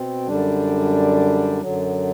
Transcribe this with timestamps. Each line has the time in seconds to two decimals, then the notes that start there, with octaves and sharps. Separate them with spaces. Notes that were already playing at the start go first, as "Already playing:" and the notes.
Already playing: B2 C4
0.28 F#2 D3 G3 D4
1.62 F#2 D3 F#3